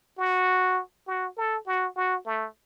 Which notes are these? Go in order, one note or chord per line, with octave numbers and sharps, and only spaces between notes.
F#4
F#4
A4
F#4
F#4
A3